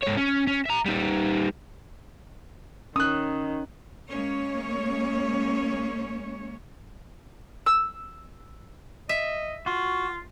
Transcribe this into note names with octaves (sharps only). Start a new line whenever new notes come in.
G#2 C#5
C#4
C#4
E5 A#5
G3 D#4
D#3 C#4 D#6 F#6
G#3 A#3 C#4 C#5
E6
D#5 E5
F4 F#4